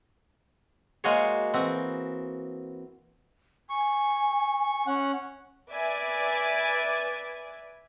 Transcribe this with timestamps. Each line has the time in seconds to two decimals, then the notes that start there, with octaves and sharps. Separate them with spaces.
1.04 G#3 A#3 F#4 G#4 C5 C#5
1.54 E3 C4 F#4
3.70 G#5 C#6
4.87 C#4 F#5
5.71 B4 D5 E5 G#5